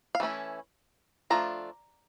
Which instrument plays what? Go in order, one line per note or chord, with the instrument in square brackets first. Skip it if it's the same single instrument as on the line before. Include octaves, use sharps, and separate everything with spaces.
[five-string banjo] F5
E3 A3 C#4 E4
F3 A3 D4 F4 A#5